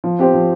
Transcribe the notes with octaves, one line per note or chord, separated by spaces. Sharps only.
F3
C4 G4 C5
F3